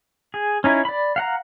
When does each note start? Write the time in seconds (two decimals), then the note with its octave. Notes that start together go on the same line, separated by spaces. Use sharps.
0.34 G#4
0.64 C#4 D#4 E4
0.85 D5 B5
1.16 F5 F#5 A#5